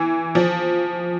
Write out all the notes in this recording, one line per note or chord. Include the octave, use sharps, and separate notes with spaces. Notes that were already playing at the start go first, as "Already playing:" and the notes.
Already playing: E3
F3